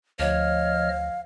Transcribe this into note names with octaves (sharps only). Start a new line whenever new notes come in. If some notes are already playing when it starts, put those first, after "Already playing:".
D2 F3 C#5 D#5 F5 F6